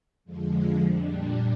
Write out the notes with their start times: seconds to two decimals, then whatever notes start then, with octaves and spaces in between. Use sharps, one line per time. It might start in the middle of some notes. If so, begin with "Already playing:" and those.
0.24 F2 D3 F3 G#3
0.81 A#2 G3 D4